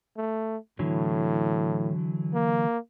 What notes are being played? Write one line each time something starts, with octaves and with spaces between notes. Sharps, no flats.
A3
A2 D3 E3 F#3
A#3